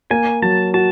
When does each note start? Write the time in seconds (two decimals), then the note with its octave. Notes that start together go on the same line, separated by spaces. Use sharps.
0.11 A#3 G#5
0.42 F#3 A5
0.74 F#4 A5